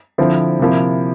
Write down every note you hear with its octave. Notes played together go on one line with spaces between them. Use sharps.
D3 F3 C4 E4
C3 F3 A#3 E4